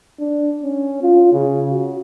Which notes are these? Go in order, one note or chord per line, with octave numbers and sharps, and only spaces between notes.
D4
C#4
F4
C#3
F#4